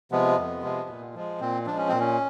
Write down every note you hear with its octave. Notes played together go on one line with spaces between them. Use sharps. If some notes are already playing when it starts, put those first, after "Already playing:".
C3 F3 G#3 B3
F2
C3 F3 G#3
A#2
F3 G#3
A#2 C4
F3 G#3 D4
C#4
A#2 C4
C#4